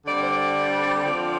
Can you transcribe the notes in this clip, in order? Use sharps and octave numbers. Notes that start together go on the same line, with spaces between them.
D3 G3 C4 D5
C5
D5
D3 F3 C4